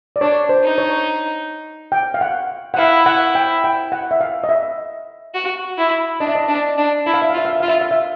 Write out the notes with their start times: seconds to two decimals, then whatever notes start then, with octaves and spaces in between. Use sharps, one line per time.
0.16 D5
0.21 D4 C#5
0.49 C5
0.64 D#4
0.78 C#5
1.92 G5
2.14 F5
2.21 F#5
2.74 F#5
2.77 E4 F5
3.06 F#5
3.35 G5
3.64 G5
3.92 F#5
4.11 E5
4.21 F5
4.44 D#5
4.49 E5
5.34 F#4
5.78 E4
6.20 D4 D#5
6.28 E5
6.35 D#5
6.48 D4
6.78 D4
7.06 E4 E5
7.14 F5
7.22 E5
7.30 F5
7.34 F4 E5
7.45 F5
7.53 E5
7.60 F4 F5
7.68 E5
7.81 F5
7.91 E5